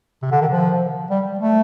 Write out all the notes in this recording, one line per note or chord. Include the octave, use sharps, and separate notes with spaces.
C3
D3
D#3
F3
G3
A3